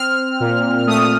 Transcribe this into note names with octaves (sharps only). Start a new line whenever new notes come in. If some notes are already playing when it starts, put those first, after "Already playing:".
Already playing: C4 F6
A#2
A3 D#6